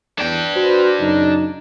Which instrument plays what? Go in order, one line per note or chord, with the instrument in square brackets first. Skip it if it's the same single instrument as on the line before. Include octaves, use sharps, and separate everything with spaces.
[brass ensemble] E2 [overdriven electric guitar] D4 G5
[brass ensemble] F#4 B4 C5
F#2 C#3 D#4